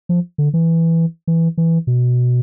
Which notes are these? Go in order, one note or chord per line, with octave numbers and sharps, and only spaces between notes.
F3
D3
E3
E3
E3
B2